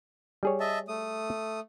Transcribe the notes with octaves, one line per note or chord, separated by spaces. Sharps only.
G3 G#4 C#5
D#5 E5 A5
A3 D#6